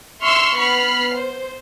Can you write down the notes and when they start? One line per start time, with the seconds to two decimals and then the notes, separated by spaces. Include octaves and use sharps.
0.23 E5 C6 C#6 E6 F6
0.58 B3 B5 F6 C7
1.15 C5